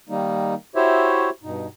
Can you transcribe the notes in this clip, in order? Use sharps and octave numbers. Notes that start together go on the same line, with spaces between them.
D#3 G3 A#3 D#4
E4 F#4 G4 C5 C#5 E5
G2 B2 D#4